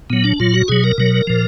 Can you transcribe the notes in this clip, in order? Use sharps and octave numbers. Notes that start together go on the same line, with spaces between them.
A#2 F#3 B3
D4
A#2 F#3 F4
F#4
B2 F#3 G#4
A#4
B2 F#3
A#2 F3